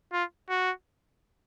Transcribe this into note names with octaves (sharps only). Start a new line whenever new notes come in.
F4
F#4